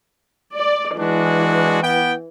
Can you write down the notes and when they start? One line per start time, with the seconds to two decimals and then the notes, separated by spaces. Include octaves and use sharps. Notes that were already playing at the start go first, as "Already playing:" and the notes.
0.56 D5
0.99 E3 G#3 D4 F#4
1.82 B3 G5